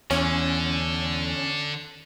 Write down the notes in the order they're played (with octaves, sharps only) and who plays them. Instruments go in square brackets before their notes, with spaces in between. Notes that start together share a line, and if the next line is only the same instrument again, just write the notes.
[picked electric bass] E2 [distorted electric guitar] D3 [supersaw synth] C#4